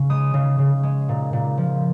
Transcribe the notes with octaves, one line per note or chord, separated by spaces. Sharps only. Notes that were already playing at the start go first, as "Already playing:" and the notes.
Already playing: C#3
G#3 D#6
C#3
C#3
G#3
A#2
A#2
F3